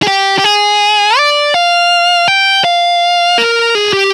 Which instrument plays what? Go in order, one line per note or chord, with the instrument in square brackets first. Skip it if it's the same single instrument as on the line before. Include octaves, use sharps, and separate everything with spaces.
[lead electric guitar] G#4
G4
G4
G#4
D5
F5
G5
F5
A#4
G#4
G4